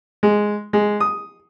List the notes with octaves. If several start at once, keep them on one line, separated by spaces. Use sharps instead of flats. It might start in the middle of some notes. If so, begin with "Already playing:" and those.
G#3
G#3
D#6